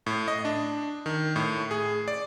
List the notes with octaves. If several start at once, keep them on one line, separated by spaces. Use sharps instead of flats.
A2
D#5
D4
D#3
A2
G#4
D5